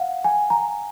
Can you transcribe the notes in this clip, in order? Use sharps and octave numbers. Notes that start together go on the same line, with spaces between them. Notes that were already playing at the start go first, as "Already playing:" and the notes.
Already playing: F5 F#5
G#5
A#5